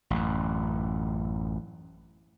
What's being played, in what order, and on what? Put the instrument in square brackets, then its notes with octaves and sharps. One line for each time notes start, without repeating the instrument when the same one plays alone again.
[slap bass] A1 F#2